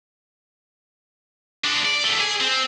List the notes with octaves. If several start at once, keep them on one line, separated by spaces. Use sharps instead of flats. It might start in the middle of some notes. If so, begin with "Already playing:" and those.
G#3 D4
D5
E2 A3
G#4
C4